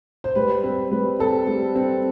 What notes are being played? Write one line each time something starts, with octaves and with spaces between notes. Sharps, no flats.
C5
G3 B4
C4 B4
G3 B4
C4 A4
G3
C4